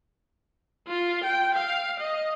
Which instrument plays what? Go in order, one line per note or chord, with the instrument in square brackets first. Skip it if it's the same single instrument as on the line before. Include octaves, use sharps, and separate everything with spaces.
[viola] F4
G5
F5
D#5